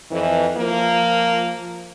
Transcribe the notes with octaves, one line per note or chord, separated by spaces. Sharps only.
F2 E3
F3 A#3